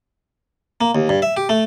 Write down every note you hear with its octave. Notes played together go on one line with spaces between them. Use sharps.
A#3
D#2
G2
E5
G4
A3